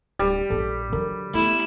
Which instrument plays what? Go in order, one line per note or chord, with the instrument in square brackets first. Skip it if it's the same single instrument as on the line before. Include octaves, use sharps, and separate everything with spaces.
[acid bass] D1 [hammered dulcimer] G3
[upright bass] A#1 A#2 [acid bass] A4
[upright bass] D3 F#3 [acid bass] A#4
[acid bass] A3 [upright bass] B3 [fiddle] E4